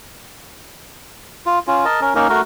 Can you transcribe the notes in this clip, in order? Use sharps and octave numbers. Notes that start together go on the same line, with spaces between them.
F4
C#4 F4
A#4 D#5 A5
C#4 A#4
A#3 C#4 D#4 A#4
A3 F#4 A#4